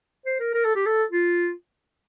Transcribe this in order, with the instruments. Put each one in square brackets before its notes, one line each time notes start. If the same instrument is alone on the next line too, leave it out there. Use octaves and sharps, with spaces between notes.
[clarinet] C5
A#4
A#4
A4
G4
A4
F4